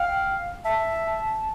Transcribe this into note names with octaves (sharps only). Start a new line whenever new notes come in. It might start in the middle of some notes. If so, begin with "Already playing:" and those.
Already playing: F5 G5
E5 A5